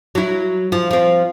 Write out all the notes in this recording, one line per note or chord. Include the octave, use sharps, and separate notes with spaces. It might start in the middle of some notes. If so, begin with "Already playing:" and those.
F#3 E4
F3
F3 C4